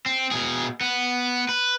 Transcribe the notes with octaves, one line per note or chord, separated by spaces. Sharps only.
C4
B2 G#4
B3
B4